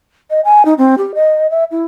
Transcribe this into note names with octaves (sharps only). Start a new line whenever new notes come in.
D#5
G#5
D#4
C4
G4
D#5
E5
E4